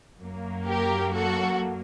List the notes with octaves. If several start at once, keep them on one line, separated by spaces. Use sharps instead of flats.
F#2 F#3 A#3
G4 A#4
F#4 A4